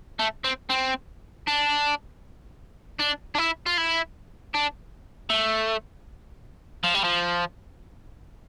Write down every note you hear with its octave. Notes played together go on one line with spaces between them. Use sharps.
A3
C4
C4
D4
D4
D4
E4
F4
E4
D4
A3
F3
G3
F3